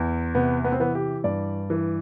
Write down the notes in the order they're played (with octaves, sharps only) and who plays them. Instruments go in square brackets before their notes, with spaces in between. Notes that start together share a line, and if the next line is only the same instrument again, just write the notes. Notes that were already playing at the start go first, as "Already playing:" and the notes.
Already playing: [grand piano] E2
C3 B3
B3
C4
E3 B3
G4
G2 D5
E3